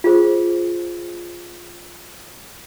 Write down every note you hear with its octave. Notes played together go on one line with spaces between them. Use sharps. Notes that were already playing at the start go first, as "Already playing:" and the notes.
F4 G#4 C5